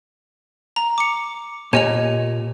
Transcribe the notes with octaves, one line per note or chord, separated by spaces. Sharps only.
A#5
D6 C#7
A#2 G4 C#5 D#5 G#5 F7